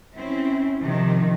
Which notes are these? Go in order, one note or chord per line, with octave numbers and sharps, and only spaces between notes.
C4 C#4 E4
C3 D#3 F3